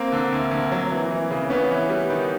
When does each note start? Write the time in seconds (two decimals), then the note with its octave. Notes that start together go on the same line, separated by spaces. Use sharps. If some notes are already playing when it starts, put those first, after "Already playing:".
Already playing: A#3 C4
0.12 D3
0.33 D2
0.51 D2
0.72 F#3
0.92 E3
1.11 E3
1.31 C#3
1.50 E3 B3 C#4
1.71 E3
1.90 G3
2.10 D#3